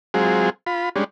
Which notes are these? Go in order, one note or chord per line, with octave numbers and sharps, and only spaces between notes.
F#3 G#3 C4 F4 G#4
F4 B5
G3 G#3 C#4 D4